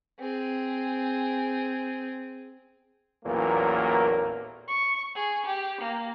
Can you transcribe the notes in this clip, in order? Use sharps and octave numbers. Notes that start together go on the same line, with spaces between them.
C4 G#4
A1 E2 A#2 F#3 A#3 A#4
C#6
G#4
G4
A#3